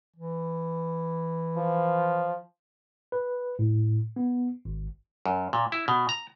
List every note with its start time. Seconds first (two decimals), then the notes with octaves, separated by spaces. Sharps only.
0.16 E3
1.56 F3
3.12 B4
3.59 A2
4.16 B3
4.65 G#1
5.26 F#2
5.53 A#2
5.72 E4
5.88 B2
6.09 A#5